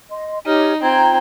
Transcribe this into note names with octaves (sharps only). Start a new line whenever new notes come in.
D#5 C6
D#4 G4 C#5 F6
C4 F4 G5 A#5 G#6